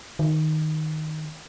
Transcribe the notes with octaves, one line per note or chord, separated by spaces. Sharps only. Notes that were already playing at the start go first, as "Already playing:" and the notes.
D#3